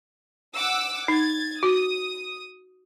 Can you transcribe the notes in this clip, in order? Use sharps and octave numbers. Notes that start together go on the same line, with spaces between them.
F#5 D6 E6
D#4 G#6 A6
F#4 D#6